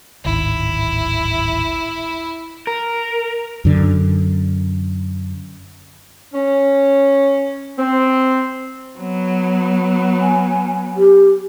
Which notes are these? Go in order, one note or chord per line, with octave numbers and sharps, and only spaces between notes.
D1 G#1 D#3 E4
A#4
F#2 D3
C#4
C4
F#3 B3
G#5
G4